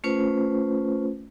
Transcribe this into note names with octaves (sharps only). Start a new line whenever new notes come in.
A3 C#4 F4 B4 C5